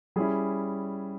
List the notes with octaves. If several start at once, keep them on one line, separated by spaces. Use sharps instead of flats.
G3 C#4 E4 G#4